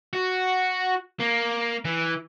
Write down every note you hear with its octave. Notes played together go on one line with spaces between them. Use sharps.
F#4
A#3
E3